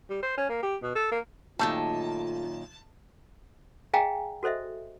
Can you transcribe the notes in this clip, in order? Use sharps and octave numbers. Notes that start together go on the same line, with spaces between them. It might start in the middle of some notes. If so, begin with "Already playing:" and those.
G3
C5
C#4
A#3
G4
B2
A4
A#3
F#2 A#2 D#3 A3 D#4 F4 G4 A5
G#4 D#5 F5 G5 G#5 A#5
F#4 A4 C5 D#5 E5